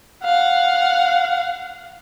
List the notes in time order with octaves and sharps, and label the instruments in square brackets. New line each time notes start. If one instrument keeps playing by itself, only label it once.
[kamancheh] F5 F#5